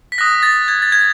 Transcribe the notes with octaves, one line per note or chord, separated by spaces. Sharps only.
B6
D#6 F#6 A#6
A6
G#6
A6
G#6